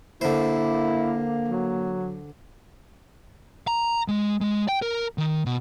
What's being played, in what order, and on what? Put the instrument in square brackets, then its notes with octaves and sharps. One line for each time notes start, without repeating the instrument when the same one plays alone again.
[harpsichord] D3 C5 [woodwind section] A#3 [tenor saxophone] E4
[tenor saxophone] F#3
[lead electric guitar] A#5
G#3
G#3
G5
A#4
D#3
B2